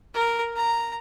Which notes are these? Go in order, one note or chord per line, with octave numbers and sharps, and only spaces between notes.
A#4
A#5